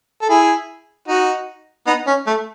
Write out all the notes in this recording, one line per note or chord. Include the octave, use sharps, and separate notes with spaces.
A4
E4 G#4
D#4 F#4
B3 D#4
C#4
A3